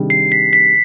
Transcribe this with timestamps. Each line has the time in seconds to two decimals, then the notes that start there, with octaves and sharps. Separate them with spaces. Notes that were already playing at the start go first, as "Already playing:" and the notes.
Already playing: C3 D#3 G3 D4 G#4
0.10 C7
0.32 B6
0.53 B6